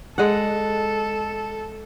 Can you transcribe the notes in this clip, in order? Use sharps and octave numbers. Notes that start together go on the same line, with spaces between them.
G#3 A4 F#5